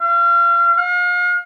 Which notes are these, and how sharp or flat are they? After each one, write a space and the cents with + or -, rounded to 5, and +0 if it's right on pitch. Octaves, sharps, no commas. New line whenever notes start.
F5 -35
F5 +40